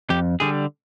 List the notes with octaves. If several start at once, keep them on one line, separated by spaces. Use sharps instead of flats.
F2 G4
D3 G3 G#4